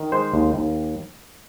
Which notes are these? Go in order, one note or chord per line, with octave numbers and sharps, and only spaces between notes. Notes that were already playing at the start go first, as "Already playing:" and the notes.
Already playing: D#3
G#3 C5
D#2
D#2